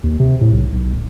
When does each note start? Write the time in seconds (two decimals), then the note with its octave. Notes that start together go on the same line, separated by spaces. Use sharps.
0.04 D#2
0.20 C3
0.41 A2
0.53 B1
0.72 B1
0.94 D1